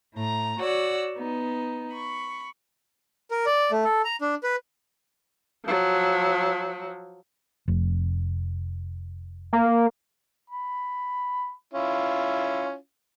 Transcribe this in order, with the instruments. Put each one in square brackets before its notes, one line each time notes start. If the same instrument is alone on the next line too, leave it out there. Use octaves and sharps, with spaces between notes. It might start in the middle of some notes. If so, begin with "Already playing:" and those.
[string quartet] A2 A#5
F#4 C#5 D5 F#5 E6
B3 D#4
B5 C#6
[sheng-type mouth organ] A#4
D5
A3
A4
A#5
D4
B4
[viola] F3 F#3
[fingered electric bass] F1
[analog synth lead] A#3
[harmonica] B5
C#4 E4 F4